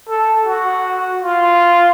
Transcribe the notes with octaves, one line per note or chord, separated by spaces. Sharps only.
A4
F#4
F4